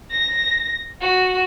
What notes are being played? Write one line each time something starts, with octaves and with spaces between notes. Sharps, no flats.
A#6
F#4